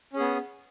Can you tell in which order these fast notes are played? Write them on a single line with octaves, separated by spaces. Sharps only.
C#4 G#4 B3